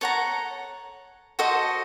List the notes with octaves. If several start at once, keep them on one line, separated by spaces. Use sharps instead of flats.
A4 C#5 F#5 A#5
F#4 A4 C5 D#5